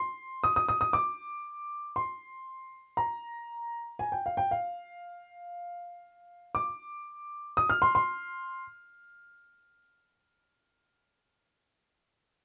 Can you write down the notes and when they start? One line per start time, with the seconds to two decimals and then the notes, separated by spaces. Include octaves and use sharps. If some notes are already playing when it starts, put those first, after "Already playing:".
Already playing: C6
0.44 D#6
0.56 D#6
0.68 D#6
0.81 D#6
0.93 D6
1.96 C6
2.97 A#5
3.99 G#5
4.12 G5
4.26 F5
4.37 G5
4.51 F5
6.55 D6
7.57 D#6
7.69 F6
7.82 C6
7.95 C6